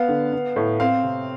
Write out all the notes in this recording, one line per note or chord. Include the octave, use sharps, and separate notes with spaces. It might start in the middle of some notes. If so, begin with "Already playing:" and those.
Already playing: B3 F5
D3
B3
A2
C4 F5
C3